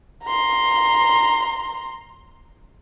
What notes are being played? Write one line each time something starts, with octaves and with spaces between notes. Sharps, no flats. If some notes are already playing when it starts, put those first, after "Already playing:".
A#5 C6